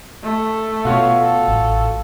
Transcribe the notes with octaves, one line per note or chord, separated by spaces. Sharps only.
A3
B2 F4 F#4 C#5
A4
A1